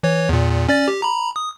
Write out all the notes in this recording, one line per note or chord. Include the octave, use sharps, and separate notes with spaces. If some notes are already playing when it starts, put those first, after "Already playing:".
E3 C#5
E2 A#2
C#4 D5 A6
G4
A#5 B5
D#6